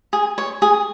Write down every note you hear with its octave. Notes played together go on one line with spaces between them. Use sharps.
G#4
C#5
G#4